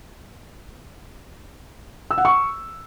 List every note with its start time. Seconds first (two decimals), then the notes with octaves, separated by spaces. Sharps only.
2.11 E6
2.18 F#5
2.25 C#6